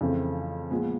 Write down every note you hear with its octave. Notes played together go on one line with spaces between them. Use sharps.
F2 C#3 E3 A3 C4
A#2 F3 G#3 B3